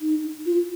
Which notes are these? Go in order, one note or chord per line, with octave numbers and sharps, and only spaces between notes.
D#4
F4